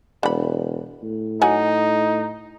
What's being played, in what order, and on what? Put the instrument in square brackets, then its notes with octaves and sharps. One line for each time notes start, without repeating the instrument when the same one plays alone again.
[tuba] E1 [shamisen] D3 B5
[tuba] A2
[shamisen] F#3 F#5 G#5 [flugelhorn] D#4